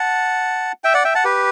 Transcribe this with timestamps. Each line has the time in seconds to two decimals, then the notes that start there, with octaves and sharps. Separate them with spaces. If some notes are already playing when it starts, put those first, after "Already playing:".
Already playing: F#5 A5
0.84 E5 G5
0.94 D5 F#5
1.04 E5 G5
1.15 F#5 A5
1.24 G4 B4